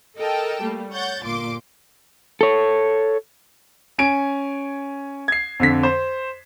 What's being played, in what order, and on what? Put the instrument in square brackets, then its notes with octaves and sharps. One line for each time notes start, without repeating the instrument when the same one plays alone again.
[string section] A4 A#4 D#5 G5 A5
G3 A3 A#3
C#5 F#5 G6 A6
G1 A#2 C6 D6
[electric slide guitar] A4 C#5
[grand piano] C#4 G#5 D7
G#6 C7
F2 D3 B6
C5